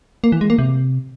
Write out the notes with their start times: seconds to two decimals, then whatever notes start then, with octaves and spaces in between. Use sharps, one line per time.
0.24 A#3
0.32 E3
0.41 G#3
0.50 A#3
0.59 C3